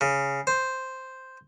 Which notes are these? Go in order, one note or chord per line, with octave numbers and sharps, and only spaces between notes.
C#3
C5